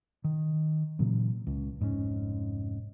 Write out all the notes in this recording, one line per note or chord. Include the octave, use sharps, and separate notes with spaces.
D#3
A#2 C#3 E3 F#3
C#2
F1 G#2 C3 C#4